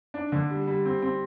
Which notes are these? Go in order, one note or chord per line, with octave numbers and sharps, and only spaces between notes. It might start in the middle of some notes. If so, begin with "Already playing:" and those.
D4
D3
G3
G3
C4
C4